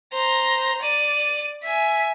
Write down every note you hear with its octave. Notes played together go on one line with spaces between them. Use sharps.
C5 A#5
D5 D#7
E5 G#5